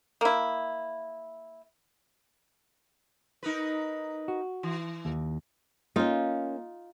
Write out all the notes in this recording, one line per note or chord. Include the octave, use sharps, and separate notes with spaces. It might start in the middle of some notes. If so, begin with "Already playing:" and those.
A#3 E4
D#4 A#4 B4
F#4
E3
D#2
A#3 C#4 D#4 F4